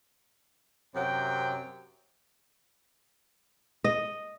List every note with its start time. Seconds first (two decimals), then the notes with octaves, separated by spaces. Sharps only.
0.95 F#2 C3 F#3 G5
3.84 D#5